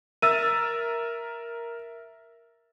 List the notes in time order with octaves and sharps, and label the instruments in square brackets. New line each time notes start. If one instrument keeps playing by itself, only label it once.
[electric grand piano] A#4 E5 A6 [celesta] E6 D#7